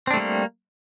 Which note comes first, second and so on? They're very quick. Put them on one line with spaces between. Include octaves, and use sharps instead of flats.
C4 D4 A3 G3 A#3